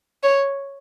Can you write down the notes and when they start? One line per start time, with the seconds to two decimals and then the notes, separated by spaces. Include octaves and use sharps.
0.23 C#5